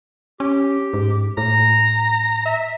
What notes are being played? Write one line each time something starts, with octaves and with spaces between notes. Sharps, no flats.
C#4 G4
G#2
A2 A#5
E5